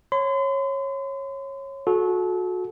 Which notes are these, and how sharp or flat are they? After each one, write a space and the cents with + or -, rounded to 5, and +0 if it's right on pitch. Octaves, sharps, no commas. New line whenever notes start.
C#5 -20 C6 -40
F#4 -25 A4 -30